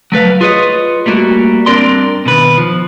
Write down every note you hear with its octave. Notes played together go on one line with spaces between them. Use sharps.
F#3 A3 B4 F5
F4 G#4 B4 C#5 D#5
G3 A3 A#3 F4 F#4
G2 C4 D4 A#4 D5 C6
B2 D#3 B4
F3